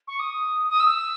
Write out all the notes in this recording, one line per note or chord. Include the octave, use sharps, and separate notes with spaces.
C#6
D#6
D#6
E6